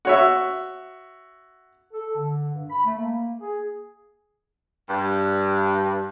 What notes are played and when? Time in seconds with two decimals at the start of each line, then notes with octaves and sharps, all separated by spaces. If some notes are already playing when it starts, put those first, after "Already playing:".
0.05 F#4 C#5 E5
1.94 A4
2.17 D3
2.53 G2
2.70 B5
2.85 A3
2.96 A#3
3.40 G#4
4.89 G2